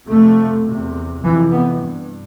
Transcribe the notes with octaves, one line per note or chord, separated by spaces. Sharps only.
F2 C3 A3
E2 C3
F2 C3 E3
B3
G2